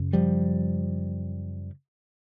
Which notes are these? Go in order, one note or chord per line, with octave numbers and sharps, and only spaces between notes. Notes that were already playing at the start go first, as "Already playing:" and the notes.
Already playing: F#2 C#3
F3 G3